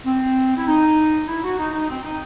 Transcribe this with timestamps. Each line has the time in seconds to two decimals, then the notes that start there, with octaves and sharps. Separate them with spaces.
0.06 C4
0.57 E4
0.67 D#4
1.28 E4
1.43 F#4
1.59 D#4
1.73 D#4
1.89 C4
2.05 D#4